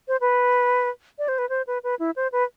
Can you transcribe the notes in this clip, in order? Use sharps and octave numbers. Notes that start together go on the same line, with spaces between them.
C5
B4
D5
C5
B4
C5
B4
B4
E4
C5
B4